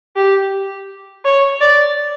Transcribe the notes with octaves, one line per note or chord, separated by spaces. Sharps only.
G4
C#5
D5